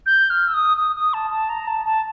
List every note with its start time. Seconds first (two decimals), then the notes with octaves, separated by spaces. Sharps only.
0.06 G6
0.30 F6
0.48 E6
0.54 D#6
0.77 D#6
0.96 D#6
1.14 A5
1.30 A5
1.49 A#5
1.67 A5
1.85 A5